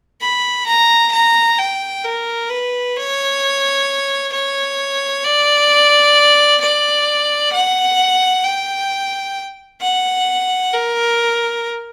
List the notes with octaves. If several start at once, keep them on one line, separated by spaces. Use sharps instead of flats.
B5
A#5
A#5
G5
A#4
B4
C#5
C#5
D5
D5
F#5
G5
F#5
A#4